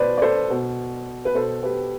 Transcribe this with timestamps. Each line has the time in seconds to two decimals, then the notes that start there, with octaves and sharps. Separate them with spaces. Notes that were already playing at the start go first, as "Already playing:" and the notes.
Already playing: B2 B4 C5 D5
0.17 D5
0.22 A4 C5
0.50 B2
1.25 B4
1.35 B2 A4 C5
1.63 G4 B4